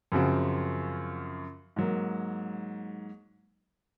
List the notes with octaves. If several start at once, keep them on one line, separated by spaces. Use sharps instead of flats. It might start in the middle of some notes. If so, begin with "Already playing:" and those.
F#2 C#3 F3 C4 F#4
G#2 F#3 A#3